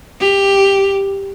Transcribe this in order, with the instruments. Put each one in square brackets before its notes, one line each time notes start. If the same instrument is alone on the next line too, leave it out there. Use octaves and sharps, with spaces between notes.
[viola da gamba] G4